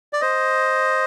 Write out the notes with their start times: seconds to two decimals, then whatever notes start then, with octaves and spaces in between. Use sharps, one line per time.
0.13 D5
0.21 C5 D#5